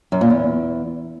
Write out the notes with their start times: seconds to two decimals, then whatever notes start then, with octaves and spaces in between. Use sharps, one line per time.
0.12 F#2
0.21 A#2
0.30 E2